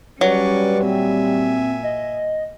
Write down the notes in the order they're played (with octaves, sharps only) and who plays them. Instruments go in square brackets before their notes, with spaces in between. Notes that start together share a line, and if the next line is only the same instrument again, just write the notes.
[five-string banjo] F#3 [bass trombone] G3 [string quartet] C#4 D5 C#6 [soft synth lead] B4
[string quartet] A#2 E5 G#5 [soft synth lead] C4
[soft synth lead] D#5